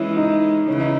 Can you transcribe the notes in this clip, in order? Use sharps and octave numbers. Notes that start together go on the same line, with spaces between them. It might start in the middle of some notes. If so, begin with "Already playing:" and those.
Already playing: E3 G#3 C#4 E4
D#4
C#3 E3 C#4
D#4